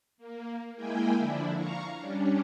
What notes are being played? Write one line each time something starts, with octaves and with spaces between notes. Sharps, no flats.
A#3
G#3 A#3 E4 G#4 G5 G#5
D3 F3 D4 E4
F5 A#5 C#6
G3 C#4 D4